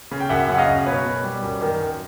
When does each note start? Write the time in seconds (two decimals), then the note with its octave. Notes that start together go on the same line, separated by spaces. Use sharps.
0.11 C#3
0.20 G5
0.29 F#2 E5 F#5
0.49 C#3 F#5
0.58 D#5 F5
0.68 F#2
0.86 B2 B4 C#5
1.05 B2
1.23 G3
1.43 F#2
1.61 D#3
1.80 F#2